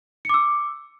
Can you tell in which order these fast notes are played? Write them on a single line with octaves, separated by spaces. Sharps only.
C#7 D6 E6